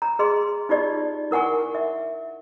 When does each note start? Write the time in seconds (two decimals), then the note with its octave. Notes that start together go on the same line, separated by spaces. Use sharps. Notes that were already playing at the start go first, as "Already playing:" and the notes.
0.02 A#5
0.19 G#4 D#5 C6
0.69 D#4 F4 G4 D5 D#5
1.31 E4 A#4 F#5 G#5 C#6
1.75 E5